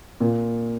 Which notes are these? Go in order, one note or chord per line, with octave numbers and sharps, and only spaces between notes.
A#2